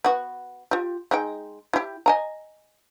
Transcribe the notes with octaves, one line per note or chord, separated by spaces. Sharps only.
B3 F#4
F4 G4
G#3 D#4 G5
E4 G4
D#5 G#5 A#5